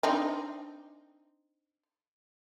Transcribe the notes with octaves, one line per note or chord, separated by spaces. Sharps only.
C4 D4 D#4